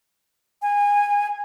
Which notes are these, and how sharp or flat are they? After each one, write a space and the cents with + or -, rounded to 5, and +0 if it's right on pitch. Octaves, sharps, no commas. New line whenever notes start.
G#5 -25